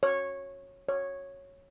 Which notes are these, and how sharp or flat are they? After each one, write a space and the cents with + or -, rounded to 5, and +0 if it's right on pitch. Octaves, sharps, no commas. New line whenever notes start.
C#5 -10
C#5 -5